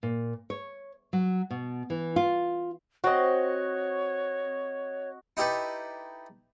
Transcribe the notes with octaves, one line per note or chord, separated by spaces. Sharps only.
A#2
C#5
F#3
B2
E3
F4
C4 F#4 C#5 D#5
D#4 E4 G4 A4 B4